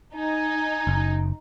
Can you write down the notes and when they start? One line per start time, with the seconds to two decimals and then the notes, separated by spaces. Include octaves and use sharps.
0.15 D#4 G#5
0.87 F#1